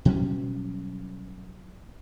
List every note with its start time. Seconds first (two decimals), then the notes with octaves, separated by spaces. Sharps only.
0.05 B2 F#3 G3 C#4